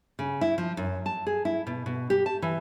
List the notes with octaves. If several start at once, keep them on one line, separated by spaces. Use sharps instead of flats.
C#3
E4
F3
F#2
A5
G#4
E4
B2
B2
G4
A5
E3